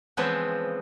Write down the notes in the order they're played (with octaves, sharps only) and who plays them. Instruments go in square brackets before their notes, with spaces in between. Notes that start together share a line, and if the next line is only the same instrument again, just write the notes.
[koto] C#3 E3 F3 G#3 B3 C4